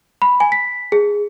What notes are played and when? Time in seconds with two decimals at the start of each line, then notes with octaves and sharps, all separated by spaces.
0.22 B5
0.40 G#5
0.52 B6
0.92 G#4